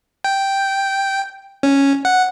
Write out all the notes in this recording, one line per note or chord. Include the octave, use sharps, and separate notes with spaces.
G5
C#4
F#5